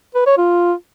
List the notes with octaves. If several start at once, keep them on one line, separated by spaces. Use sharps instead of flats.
B4
C#5
F4